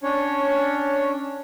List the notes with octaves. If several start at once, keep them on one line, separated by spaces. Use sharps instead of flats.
C#4 D4 C#5